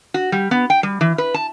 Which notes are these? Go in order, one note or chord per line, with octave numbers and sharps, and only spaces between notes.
F#4
G3
B3
G5
G3
E3
B4
A5